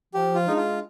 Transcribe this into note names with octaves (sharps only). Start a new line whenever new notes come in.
F3 G4
F4
G#3 D4 D#4
F4